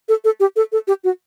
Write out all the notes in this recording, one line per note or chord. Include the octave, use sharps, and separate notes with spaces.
A4
A4
G4
A4
A4
G4
F#4